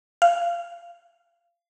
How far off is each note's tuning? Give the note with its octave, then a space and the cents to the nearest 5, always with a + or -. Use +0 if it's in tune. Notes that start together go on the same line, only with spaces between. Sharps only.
F5 -25